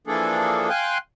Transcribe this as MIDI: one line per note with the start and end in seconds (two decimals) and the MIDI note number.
0.07 0.69 52
0.07 0.69 53
0.07 0.69 58
0.07 0.69 62
0.07 0.69 68
0.07 0.69 69
0.70 0.98 77
0.70 0.98 79
0.70 0.98 80
0.70 0.98 84
0.70 0.98 90